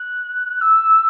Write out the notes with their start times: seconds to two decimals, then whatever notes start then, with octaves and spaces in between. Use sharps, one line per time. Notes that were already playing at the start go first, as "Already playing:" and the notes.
Already playing: F#6
0.61 E6